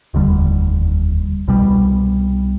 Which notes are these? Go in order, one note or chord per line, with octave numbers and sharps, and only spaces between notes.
F1 D#2 D3 G3
C2 B2 G3